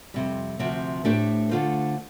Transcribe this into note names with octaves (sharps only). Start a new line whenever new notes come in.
F2 C3 G3
D2 C3 F3 C4
A2 A3 D4 G4 C5
D3 A3 F4 C5